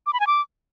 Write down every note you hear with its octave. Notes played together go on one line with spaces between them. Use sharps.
D6
B5
G#5
D6